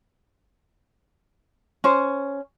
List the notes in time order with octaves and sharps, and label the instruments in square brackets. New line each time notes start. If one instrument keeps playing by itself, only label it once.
[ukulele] C#4 C5